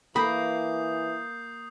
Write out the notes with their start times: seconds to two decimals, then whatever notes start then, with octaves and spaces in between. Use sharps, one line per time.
0.16 E3 A#3 B5 D#6 G6 C7